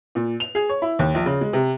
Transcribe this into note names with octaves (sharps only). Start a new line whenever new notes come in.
A#2
F7
G#4
C#5
E4
D#2
A#1
C#3
G#3
C3